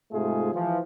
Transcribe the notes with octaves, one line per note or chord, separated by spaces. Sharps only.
G#2 C3 G#3 A3 F4 G#4
E3 F3